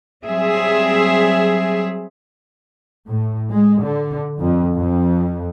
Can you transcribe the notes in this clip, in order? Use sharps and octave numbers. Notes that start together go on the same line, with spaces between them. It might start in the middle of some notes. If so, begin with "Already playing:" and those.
F#3 G3 C4 G#4 E5
A2
G#3
D3
F2
F2